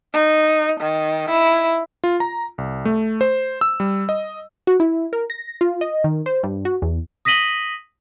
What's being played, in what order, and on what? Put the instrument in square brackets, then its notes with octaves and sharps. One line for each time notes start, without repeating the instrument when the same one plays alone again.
[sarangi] D#4
D#3
E4
[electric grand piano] F4
A#5
C2
A3
C5
E6
G3
D#5
[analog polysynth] F#4
E4
A#4
A#6
F4
D#5
D#3
C5
G2
F#4
E2
[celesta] D#6 A#6 B6 D#7 F#7 G7